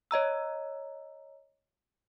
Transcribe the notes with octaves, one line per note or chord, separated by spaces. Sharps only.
C#5 D#5 A#5 E6